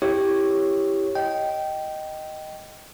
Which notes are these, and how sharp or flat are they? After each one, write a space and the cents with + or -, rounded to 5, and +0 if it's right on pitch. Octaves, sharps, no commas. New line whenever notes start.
E4 +0 G4 +0 C#5 -10
D#5 +0 G5 -15